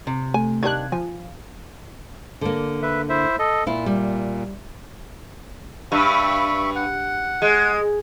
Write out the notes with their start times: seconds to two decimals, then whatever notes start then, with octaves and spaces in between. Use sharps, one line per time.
0.07 C3
0.34 A3 G#5
0.63 D#3 G3 D4 F5 F#6 G#6
0.92 F3 G#5
2.41 D3 A#3
2.82 B4 E5
3.09 E4 C5 E5
3.39 A4 D#5
3.67 A#2 E4 F4
3.86 G3
5.92 G2 E5 B5 C#6
6.76 F#5
7.42 G#3